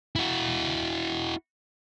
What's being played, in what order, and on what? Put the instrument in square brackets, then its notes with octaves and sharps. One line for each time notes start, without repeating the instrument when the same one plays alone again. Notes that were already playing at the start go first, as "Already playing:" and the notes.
[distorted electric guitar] E4 F#4